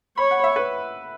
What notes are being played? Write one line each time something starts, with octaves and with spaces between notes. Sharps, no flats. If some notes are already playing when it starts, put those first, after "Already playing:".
C#5 B5
F#5
E5
B4